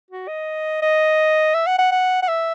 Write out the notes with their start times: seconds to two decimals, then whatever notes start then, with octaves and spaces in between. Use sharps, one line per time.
0.11 F#4
0.28 D#5
0.82 D#5
1.54 E5
1.66 F#5
1.78 F#5
1.91 F#5
2.22 F#5
2.28 E5